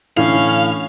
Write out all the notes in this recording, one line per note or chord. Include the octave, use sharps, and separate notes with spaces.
A2 D3 E3 C#4 F5